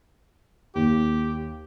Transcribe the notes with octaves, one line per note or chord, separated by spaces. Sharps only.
D#2 G4